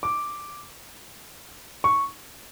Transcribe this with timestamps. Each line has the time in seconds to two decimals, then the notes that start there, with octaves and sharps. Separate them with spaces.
0.03 D6
1.84 C#6